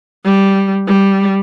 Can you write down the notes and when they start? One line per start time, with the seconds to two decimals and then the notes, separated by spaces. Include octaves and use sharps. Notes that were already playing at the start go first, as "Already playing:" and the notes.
0.25 G3
0.87 G3